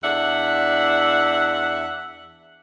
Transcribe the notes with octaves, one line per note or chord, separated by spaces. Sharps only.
E2 D4 E5 F#5